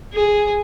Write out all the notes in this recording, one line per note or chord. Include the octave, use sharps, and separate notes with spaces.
G#4